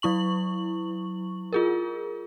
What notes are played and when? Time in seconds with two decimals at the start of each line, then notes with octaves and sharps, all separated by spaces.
0.02 F#3 E4 C#6 F#7
1.53 F4 G#4 A#4